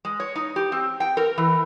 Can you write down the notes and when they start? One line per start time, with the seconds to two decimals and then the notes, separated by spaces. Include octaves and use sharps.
0.05 G#3
0.20 C#5
0.36 D#4
0.56 G4
0.72 C4
1.00 G5
1.17 A#4
1.38 E3